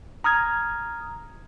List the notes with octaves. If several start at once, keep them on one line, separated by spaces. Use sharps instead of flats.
A#5 D#6 F6 G#6